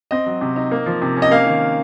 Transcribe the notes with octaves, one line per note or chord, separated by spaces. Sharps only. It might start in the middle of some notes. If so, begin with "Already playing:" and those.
C4 D#5
F#3
C3
D#4
A#3
F3
C3
C#4
D#5
A#3 F5
D#3